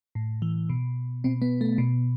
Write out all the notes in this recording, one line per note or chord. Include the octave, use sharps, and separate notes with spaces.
A2
E3
B2
B2 C4
B3
A3
B2